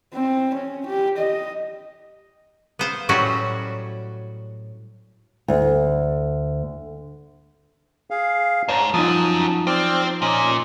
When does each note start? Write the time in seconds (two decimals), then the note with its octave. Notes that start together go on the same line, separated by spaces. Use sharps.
0.14 C4
0.54 C#4
0.86 G4
1.17 D#5
2.79 B3 C5 F5
3.09 A2 F#3 G3 C#4 F#4 C5
5.48 D2
8.10 G#4 F5
8.69 G#2 C#5 A5 A#5
8.94 F#2 F3 D#4 A5 D#6
9.67 C4 D5 D6 F6
10.22 A#2 C#4 D#5